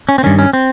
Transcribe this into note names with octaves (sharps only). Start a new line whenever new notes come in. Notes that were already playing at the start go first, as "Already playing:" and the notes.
C#4
C4
G2 D#3 C#4
C#4
C4